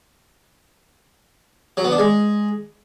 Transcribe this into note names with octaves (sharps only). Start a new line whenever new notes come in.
F#3
B3
D4
G#3